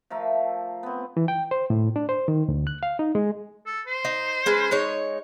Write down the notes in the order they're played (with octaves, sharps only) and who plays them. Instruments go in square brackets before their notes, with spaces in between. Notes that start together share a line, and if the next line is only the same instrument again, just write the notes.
[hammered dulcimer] F3 A3 A#4 E5
B3 C4
[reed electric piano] E3
G5
C5
A2
D4
C5
D#3
D2
F#6
F5
D#4
G#3
[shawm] A4
C5
[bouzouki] D#4
G#3 C#4 B4
G#3 D#4 C#5